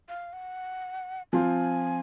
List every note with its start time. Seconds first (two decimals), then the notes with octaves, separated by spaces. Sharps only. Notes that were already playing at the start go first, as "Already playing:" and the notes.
0.09 F5
0.33 F#5
1.33 F3 C4 F4 G#5